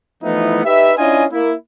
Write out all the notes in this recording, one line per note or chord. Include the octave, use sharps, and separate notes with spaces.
E3 F3 A3 B3 D#4 E4
D#4 G4 B4 E5
C#4 D4 E4 F4 D#5 G#5
A#3 E4